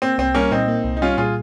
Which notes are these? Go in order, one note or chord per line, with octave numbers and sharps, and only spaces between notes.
A#3 C4
C2 C4
G3 A#3 C#4
A#2 C4 D#4
A#3
C2
D#4
G3 C#4 F4
A#2 F4 G#4